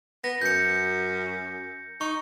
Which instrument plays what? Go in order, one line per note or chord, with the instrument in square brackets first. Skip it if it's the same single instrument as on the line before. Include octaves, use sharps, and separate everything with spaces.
[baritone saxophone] B3 [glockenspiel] A#6
[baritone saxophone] F#2 [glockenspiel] G6 C#7
[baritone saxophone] D#4 [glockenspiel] C#6